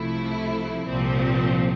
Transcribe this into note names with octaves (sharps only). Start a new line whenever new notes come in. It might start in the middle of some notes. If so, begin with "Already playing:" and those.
Already playing: C2 C3 F3 A3 E4
C2 A#2 F3 C4